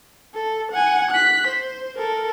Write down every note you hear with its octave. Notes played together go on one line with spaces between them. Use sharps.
A4
F#5 G#5
F#6 B6
C5
A4 A#4